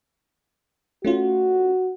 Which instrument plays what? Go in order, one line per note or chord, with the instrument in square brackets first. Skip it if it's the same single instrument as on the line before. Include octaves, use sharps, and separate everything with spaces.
[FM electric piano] A3 C#4 F4 [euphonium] F#4